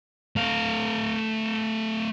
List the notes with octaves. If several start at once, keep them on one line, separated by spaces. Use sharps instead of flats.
A3 F5